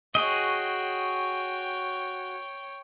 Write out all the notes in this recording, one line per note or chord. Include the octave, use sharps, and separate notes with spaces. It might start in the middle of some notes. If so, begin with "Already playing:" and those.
F#4 G#4 C#5 D#5 G5